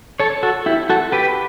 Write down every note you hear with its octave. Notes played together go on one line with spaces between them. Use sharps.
A4 C#5
F#4 A4
E4 G4
F#4 A4
G4 B4